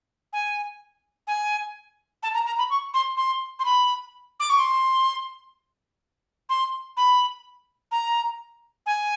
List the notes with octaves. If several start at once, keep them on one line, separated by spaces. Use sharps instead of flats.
G#5
G#5
A5
A#5
A#5
B5
C#6
C6
C6
C6
B5
D6
C#6
C6
C6
B5
A#5
G#5